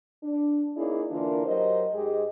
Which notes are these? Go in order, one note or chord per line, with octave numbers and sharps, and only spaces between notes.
D4
A#3 C#4 D#4 E4 G#4 D5
D3 E3 A#3 D4 F4 A#4
F#3 G4 A#4 C5 D#5
G#2 G#3 G4 G#4 D#5